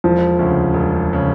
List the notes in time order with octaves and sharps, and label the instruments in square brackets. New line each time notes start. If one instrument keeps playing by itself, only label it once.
[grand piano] E1 [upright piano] F3
[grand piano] D2 C#3
E1
C#3